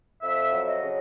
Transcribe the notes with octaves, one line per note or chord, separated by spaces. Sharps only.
F2 E5
F#3
D#5
C#3